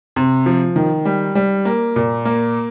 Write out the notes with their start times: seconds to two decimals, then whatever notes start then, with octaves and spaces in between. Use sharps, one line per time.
0.16 C3
0.46 F3
0.76 D#3
1.05 G3
1.35 G3
1.65 A#3
1.96 A#2
2.25 A#3